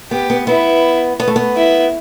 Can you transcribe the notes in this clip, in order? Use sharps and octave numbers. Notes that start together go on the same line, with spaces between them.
B3 G4
B3
B3 E4
B3
A3
B3
E4